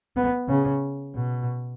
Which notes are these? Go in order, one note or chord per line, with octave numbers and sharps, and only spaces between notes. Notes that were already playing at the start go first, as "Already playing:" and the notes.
B3
C#3
B2